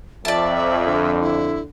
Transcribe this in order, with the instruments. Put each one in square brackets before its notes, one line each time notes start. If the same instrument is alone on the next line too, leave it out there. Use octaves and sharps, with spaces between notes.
[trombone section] F2 [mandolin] D5 A5 [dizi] E5
[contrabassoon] D3
[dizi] E4